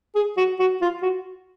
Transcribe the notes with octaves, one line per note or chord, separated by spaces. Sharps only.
G#4
F#4
F#4
F4
F#4